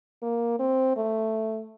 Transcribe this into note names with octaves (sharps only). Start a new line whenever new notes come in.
A#3
C4
A3